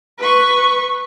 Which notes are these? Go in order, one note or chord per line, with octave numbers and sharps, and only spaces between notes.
B4 C#6